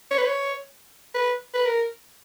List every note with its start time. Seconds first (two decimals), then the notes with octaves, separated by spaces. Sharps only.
0.11 C#5
0.18 B4
0.26 C#5
1.15 B4
1.54 B4
1.66 A#4